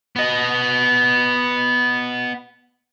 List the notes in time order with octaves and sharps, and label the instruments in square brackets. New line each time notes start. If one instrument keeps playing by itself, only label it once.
[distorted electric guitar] B3 D#5